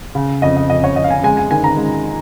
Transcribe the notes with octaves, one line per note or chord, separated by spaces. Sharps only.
C#3
F2 D#5
D#5
F2 D#5
C#5
F2 D#5
F5
G#5
G#3 G#5
G#5
D#3 G#5
A#5
G#3